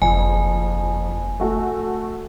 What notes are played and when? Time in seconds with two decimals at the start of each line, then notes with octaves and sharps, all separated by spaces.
0.02 F#1 F2 G#5
1.40 A3 F#4 A4